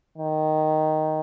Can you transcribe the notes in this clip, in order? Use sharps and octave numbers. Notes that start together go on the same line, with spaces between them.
D#3